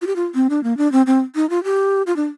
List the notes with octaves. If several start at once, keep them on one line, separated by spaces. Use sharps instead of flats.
F4
G4
F4
C4
D4
A#3
D4
C4
C4
D#4
F4
G4
F4
D4